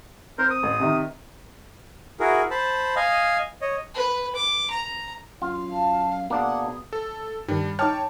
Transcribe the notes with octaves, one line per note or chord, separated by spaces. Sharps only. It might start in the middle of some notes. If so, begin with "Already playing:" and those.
C4 A#4 C5
D#6
A1
C3 D#3
E4 F#4 G#4 A#4
C5 A5 B5
D#5 F5 G#5
C#5 D#5
B4
D6
A#5
F#2 F4 F5
A5
B2 A#3 D4 G#4 F#5
A4
G2 D#3 G3 D4
D#4 C#5 G5 A5 D6 F6